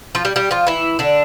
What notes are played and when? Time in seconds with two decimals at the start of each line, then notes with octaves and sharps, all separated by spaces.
0.15 F3 F4
0.25 G3 G4
0.36 G3 G4
0.51 F3 F4
0.67 E3 E4
0.99 D3 D4